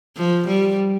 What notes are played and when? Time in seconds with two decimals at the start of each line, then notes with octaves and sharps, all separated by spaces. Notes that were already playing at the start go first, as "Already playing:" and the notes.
0.17 F3
0.47 G3